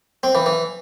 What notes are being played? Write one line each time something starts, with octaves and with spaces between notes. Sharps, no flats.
C4
E3
E3